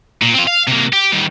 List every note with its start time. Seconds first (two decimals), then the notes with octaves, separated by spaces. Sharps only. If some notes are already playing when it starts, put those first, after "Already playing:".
0.22 A#2
0.34 C4 F4
0.47 F5
0.67 C3 A#3
0.93 G4
1.13 D#3 G3